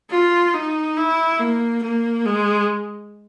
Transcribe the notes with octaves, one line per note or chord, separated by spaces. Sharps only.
F4
D#4
E4
A#3
A#3
G#3